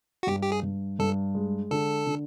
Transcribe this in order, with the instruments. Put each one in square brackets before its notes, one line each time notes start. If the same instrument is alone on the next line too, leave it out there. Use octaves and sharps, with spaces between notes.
[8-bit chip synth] F#4
[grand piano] G2 [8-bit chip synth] G4
[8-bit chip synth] G4
G#4
[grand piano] G2
[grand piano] G2 [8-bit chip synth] A4
[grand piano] G#3
[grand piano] D3 [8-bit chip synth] A4
[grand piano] D3